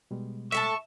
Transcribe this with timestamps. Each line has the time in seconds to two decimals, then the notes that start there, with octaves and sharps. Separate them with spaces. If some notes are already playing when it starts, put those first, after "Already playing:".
0.11 B2 G3 G#3
0.52 A2 A4 E5 A5 C#6